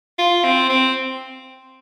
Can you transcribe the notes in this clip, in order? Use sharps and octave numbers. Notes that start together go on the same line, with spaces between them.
F4
C4
C4